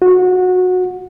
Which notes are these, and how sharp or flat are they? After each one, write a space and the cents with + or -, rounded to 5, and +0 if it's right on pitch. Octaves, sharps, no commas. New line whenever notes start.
F#4 -20